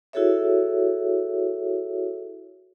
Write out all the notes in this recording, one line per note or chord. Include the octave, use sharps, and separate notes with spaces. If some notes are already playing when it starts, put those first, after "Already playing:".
E4 F#4 G#4 A4 C#5 E5